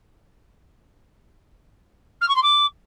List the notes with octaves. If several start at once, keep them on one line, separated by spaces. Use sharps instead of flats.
F6
C#6
C6
D6